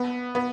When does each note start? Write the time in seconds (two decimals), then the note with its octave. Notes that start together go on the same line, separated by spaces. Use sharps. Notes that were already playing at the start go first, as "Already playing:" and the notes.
Already playing: B3
0.35 B3